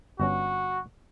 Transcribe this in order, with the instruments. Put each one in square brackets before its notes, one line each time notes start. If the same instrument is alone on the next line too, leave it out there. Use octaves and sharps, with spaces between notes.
[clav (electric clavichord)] G1 G2 C#4 [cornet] F#4